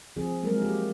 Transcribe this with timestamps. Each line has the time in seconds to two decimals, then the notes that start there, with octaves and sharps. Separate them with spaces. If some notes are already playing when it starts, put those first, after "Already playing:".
0.16 F3 C4 G#4
0.43 F#3 G#3 A#3 C4 A#4
0.61 E4 G4